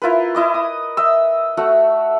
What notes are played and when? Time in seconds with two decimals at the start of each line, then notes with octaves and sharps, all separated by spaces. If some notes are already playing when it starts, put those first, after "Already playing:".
0.02 E4 F4 A#4 B4
0.35 E4 D#5 D6
0.54 D#6
0.97 D#5 E5 E6
1.57 A3 F#4 E5 F#5